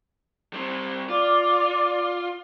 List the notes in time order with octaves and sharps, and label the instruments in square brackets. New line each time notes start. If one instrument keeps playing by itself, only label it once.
[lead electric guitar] G3 C4
[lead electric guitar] F4 [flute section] D5 D6